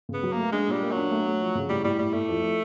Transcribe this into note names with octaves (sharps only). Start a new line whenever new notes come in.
C#3 B3
F#3
A3 A#3
G#3 D4
A#2 G3
A#3
F#3
D4
A3
A3
F3
C#3
A2 G3
A2 G3
A2 G3
A2 A3
F2
F3